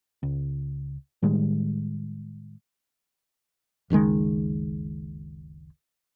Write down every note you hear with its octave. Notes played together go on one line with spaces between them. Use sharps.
C#2
A2 D#3 G3 G#3
F#1 C#2 D#3 G#3